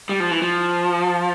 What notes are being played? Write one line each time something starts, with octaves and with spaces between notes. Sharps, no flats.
G3
F3
E3
F3